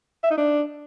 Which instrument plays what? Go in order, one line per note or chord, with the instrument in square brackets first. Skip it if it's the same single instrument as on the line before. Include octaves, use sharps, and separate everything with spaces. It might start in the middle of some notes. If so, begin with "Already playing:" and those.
[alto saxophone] E5
D#4
D4